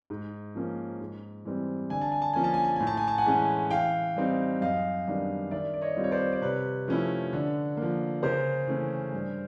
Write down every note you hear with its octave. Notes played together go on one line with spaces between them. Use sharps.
G#2
F3 A#3 C#4
G#2
E3 G3 C4
D3 G#5
A5
G#5
A5
F3 A#3 C#4 G#5
A5
G#5
A5
A2 G#5
A5
G#5
A5
F#5 G#5
E3 G#3 C#4
E3 F5 G5
G3 C4 D#4
F#2 D#5 F5
D#3 G3 B3 D4
D#3 D5 E5
D5
C#5 D#5
G3 C4 F4
C#5
C5 D5
D5
C3 B4 C#5
F3 A3 C#4 E4
D3
A#3
F3
C#3 A#4 C5
E3 A3 C#4
G2